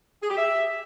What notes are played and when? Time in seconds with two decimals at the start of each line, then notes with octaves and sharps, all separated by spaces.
0.21 G#4
0.29 G4
0.36 E5